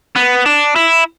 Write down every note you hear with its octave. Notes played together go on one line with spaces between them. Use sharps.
B3
D4
E4